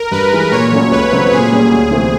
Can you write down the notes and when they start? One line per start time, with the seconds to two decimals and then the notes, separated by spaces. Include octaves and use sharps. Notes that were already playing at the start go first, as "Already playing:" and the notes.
Already playing: A#4
0.11 G2 B4
0.32 E3 G#3
0.52 A#2 C#5
0.72 F#3 A3 C#4
0.91 C#2 B4
1.11 C#3 F#3 A3 C4
1.31 A#2 G#4
1.51 G3 A#3 C#4
1.71 D2
1.91 C3 E3 A3 C4